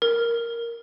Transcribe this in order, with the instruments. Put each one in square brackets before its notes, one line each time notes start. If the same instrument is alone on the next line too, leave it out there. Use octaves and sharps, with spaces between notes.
[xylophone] A#4